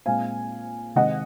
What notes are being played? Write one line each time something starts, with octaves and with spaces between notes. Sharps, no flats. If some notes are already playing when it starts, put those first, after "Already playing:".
A#2 G#3 C4 F5 G#5
C3 D#3 G#3 C4 D#5 F#5